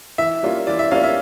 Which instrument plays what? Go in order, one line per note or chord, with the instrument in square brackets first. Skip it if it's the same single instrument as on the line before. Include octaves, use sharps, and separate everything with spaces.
[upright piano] E3 [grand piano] E5
[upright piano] G3 A#3 C#4 F4
[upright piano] E3 [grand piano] D5
[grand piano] E5
[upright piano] G3 A#3 C#4 F4 [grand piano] F5
[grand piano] E5